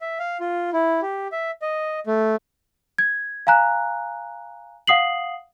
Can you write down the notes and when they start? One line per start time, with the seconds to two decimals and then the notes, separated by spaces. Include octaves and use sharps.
0.01 E5
0.19 F5
0.40 F4
0.73 E4
1.02 G4
1.32 E5
1.62 D#5
2.07 A3
2.99 G#6
3.47 F5 G#5 A#5 F#6
4.87 F5 F#5 D#6 C7 F#7